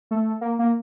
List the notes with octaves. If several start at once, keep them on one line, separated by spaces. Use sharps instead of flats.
A3
A#3
A#3